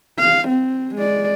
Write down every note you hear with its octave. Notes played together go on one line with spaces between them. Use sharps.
F5
C4
G#3 D5